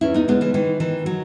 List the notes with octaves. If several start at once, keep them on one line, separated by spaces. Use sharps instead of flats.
E2 C#4 E4
B3 D#4
C#3 G#3 B3
E3 G#3
D#3 E3
D#3 E3
F#3